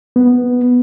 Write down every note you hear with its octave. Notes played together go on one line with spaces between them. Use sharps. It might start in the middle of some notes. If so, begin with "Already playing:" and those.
B3